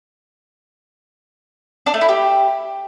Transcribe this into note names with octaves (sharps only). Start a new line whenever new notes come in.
D4
A3
E4
G4